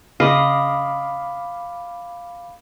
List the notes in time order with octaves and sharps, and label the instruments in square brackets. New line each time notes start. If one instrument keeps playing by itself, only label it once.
[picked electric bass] C#3 [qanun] D#5 [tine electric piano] F5 B5 D6